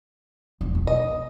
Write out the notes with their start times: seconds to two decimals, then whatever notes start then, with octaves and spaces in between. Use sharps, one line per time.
0.61 E1
0.75 B2
0.87 D#5